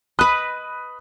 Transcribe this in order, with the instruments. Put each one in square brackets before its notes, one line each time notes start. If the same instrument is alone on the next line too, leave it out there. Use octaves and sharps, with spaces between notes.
[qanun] B4 D#5 [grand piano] B5 D#6 F#6